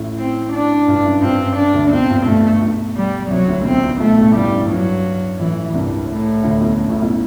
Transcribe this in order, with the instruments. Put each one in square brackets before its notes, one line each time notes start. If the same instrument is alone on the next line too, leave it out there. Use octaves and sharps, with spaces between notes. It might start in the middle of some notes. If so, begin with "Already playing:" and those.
Already playing: [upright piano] A1 A2
[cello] C4
D4
[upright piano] G2
F#2
[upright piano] G2 [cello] C4
[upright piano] F#2
[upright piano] F#2 [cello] D4
[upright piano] D2 D3
[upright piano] B1 B2 [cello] C4
[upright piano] G2
[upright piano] G2 [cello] A3
[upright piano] B1 B2
[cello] G3
[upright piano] C2 C3 [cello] F#3
[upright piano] D2 D3
[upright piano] B1 B2 [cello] C4
[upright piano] C2 C3
[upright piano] B1 B2 [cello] A3
[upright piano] A1 A2
[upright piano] G2 [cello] G3
[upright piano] F#2
[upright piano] G2 [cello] F#3
[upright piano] A1 A2 [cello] E3
[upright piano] C2 C3 [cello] G2
[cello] A2
[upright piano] D2 D3
B1 B2
F#2
A1 A2
B1 B2